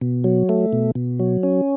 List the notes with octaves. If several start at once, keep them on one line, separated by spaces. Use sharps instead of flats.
B2
F#3
A3
B2
B2
F#3
C#4